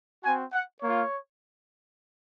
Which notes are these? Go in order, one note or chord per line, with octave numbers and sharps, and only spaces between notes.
C4 F#4 G#5
F#5
A#3 F4 C#5